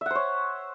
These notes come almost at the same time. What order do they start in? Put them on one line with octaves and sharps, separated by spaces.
E5 F#5 C5 C#5